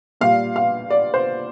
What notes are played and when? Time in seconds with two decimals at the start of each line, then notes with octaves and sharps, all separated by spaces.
0.21 A#2 G3 F5
0.56 F5
0.90 D5
1.14 C5